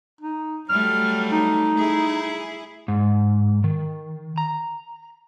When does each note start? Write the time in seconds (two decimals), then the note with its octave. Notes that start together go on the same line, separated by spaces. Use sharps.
0.21 D#4
0.69 F#3 G3 A3 F6
1.32 D#4
1.79 E4 G#4
2.88 G#2
3.64 D#3
4.38 A#5